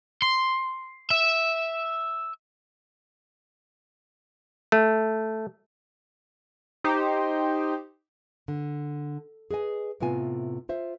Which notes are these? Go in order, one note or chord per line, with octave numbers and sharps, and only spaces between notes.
C6
E5
A3
D#4 G4 C5
D3
G#4 B4 D#5 G#5
A2 C3 B3 F4 G#5
F4 C5 E5